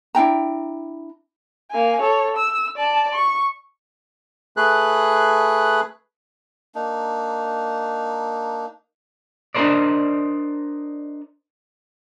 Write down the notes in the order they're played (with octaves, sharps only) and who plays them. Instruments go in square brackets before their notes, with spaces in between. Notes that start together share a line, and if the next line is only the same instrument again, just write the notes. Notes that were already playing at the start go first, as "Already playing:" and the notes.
[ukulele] D4 E4 G5 A#5
[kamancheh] A#3 G#5
A4 C#5
E6
D5 A5
C#6
[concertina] A3 G#4 B4 F#6
[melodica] A#3 D4 D#4
[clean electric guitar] D4 D#4 F#4 A#4 C5 D5